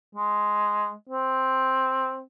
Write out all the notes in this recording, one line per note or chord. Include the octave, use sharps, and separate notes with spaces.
G#3
C4